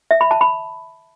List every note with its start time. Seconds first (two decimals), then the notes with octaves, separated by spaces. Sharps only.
0.11 E5
0.21 B5
0.31 A5
0.41 B5